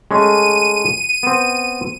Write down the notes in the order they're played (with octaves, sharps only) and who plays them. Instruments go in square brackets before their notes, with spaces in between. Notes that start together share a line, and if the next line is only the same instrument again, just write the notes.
[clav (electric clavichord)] G#3 A3 C#4 [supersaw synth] D#7
[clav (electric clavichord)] B3 C4